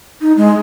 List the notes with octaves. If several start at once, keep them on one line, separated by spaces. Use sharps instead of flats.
D#4
G#3